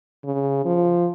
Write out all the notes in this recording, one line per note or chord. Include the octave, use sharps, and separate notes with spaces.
C#3
F3